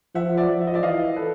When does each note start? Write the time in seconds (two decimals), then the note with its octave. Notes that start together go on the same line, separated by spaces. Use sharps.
0.15 F3 E5 F#5
0.37 D5 E5
0.49 F3
0.61 E5
0.67 D#5
0.74 D5 E5
0.83 E3 D#5 F5
1.16 A4 B4